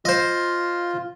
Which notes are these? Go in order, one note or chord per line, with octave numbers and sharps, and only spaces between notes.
F4 C5 D#5